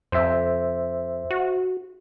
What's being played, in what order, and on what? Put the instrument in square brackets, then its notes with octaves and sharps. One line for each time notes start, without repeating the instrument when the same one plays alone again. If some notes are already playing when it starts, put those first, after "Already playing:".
[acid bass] F2 [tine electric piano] C5 E5
[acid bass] F#4